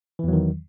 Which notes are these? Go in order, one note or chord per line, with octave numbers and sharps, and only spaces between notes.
E2 D#3 E3 F#3